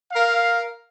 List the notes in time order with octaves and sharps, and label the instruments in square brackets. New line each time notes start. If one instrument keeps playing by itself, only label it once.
[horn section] A#4 F5